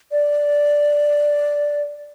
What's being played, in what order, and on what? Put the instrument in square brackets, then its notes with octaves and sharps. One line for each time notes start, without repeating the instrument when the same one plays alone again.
[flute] D5